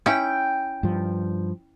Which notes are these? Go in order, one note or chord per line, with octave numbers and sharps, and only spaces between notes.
C#4 E4 G5
G2 F3